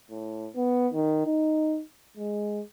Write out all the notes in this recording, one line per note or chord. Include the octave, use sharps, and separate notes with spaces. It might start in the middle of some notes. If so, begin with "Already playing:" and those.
A2
B3
D#3
D#4
G#3